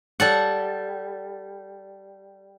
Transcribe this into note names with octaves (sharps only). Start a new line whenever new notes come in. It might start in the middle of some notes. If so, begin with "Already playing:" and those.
G3 A4 F#5